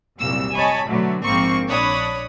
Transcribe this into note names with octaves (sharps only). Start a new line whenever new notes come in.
C2 F#2 A#2 E6
C#5 D#5 G#5 A5 B5
B2 D3 F#3 A3
A#1 G#2 A#3 C4 C#6
A#1 D4 C#5 B5 D#6